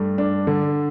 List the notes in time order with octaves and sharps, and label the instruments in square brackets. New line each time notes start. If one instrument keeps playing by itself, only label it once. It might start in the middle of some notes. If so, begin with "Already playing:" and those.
Already playing: [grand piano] G2 A3
D4
D3